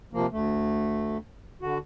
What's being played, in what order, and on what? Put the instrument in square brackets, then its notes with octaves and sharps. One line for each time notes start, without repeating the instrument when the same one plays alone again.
[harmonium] C3 F3 A#3
D2 A3
D3 F#4